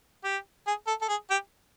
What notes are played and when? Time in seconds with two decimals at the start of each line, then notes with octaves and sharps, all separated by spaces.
0.24 G4
0.67 G#4
0.87 A4
1.02 A4
1.09 G#4
1.30 G4